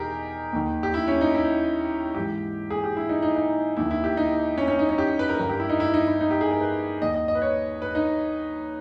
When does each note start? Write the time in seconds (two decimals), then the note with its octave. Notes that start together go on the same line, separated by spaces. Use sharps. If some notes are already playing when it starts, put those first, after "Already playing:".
Already playing: E2 B2 D#4 G4 G#4 A#4
0.53 D#2 D#3
0.83 G4
0.94 E4
1.08 C#4
1.21 D#4
1.35 E4
2.15 G#2 E3 G4
2.70 G#4
2.84 G4
2.97 E4
3.09 D#4
3.22 D#4
3.36 D#4
3.77 D#2 D#3 E4
3.91 E4
4.04 G4
4.17 D#4
4.58 C#4
4.68 C#4
4.79 D#4
4.89 C#4
4.98 G4
5.19 B4
5.29 A#4
5.39 G2 D#3 A#4
5.50 G4
5.60 E4
5.69 D#4
5.80 E4
5.94 D#4
6.07 E4
6.21 D#4
6.31 G4
6.41 G#4
6.51 A#4
6.61 B4
7.01 D#2 D#3 D#5
7.14 D#5
7.28 D#5
7.35 B4
7.42 C#5
7.82 B4
7.95 D#4